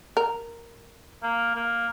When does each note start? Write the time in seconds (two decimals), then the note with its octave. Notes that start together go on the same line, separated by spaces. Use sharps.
0.17 A#4
1.23 A#3
1.56 A#3